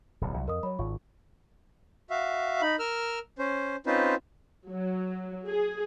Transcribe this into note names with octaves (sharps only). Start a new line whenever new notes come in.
D1 B1
C2 F#3
F2 A#4 D#5 D#6
F#3 C#5 B5
G#1 F4 C#6
F#4 E5 F5
D#4 B5
A#4 E6 F6
C#4 C5
C4 C#4 D#4 F4 B4 C5
F#3
G#4